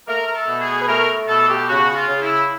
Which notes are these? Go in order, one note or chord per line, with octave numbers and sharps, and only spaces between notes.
A3 A#4
A#4
A4
B2
G#4
B4
A3 A#4
B2 A4
G4
C#3 F#4
F#4
F4
C#3
E4